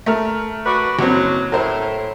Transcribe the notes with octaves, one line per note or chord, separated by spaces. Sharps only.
A3 A#4 F6
F#4 B4 D5
F#1 F#3 C4
A2 A#4 C5